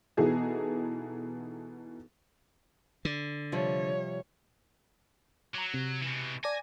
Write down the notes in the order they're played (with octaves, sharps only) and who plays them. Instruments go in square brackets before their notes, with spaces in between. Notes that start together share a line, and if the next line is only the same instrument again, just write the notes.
[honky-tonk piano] B2 E3 B3 D#4 G#4 A4
[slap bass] D3
[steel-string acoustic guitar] C3 F3 G3 [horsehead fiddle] C#5
[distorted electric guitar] F#3 [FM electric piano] A#5 D6
[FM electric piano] C3
[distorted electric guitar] B2 E3
[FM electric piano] D5 A5 A#6 [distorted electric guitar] G#5